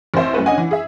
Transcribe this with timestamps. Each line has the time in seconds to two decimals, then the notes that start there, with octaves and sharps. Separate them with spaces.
0.14 A1 C4 C5 E5
0.34 F#2 A3 B4
0.46 C#4 D4 D#5 F#5 G#5
0.58 E3
0.71 G#4 E5